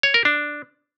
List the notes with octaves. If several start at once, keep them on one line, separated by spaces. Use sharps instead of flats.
C#5
A#4
D4